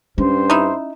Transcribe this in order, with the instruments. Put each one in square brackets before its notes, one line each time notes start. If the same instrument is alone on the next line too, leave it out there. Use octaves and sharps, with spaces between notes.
[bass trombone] G2 [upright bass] C#4 [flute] C5
[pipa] D#4 E4